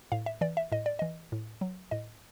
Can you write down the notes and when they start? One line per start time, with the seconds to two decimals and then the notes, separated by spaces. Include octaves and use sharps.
0.12 A2 F5
0.26 E5
0.41 E3 D5
0.57 E5
0.72 A2 D#5
0.86 D5
0.99 E3 D#5
1.32 A2
1.61 F#3
1.91 A2 D#5